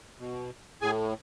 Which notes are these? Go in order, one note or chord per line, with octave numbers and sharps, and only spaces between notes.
B2
A2 G#4 G#5